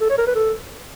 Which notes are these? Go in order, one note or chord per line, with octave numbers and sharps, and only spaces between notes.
A4
C#5
A#4
B4
A4